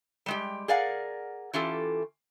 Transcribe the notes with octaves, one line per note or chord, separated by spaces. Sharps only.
G3 G#3 G4
G#4 A#4 D5 F5 F#5
E3 C#4 F4 G4 A4